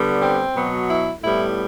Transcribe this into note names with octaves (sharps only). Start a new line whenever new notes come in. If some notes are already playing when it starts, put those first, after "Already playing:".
Already playing: D3 G3 B3
C4
B2 F#3 B3
E4
A2 G3 B3 E4